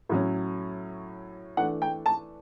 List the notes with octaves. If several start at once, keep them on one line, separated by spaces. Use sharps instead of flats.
A2 F#3 C#4
E3 A3 D4 F#5
G5
A5